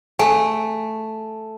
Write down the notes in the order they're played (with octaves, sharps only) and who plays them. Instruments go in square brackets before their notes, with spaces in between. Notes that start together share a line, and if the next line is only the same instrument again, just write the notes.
[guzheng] A3 [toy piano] G#5